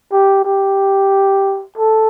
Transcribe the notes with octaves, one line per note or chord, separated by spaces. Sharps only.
G4
G4
A4